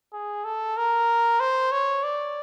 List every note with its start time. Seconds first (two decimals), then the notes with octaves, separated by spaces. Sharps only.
0.13 G#4
0.45 A4
0.77 A#4
1.40 C5
1.72 C#5
2.03 D5